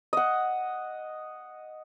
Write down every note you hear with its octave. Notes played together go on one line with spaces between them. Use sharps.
D#5 F#5